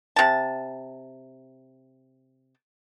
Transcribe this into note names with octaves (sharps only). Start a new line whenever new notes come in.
C3 A5